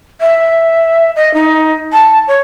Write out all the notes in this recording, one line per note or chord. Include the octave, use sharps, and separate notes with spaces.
E5
D#5
D#4
A5
C#5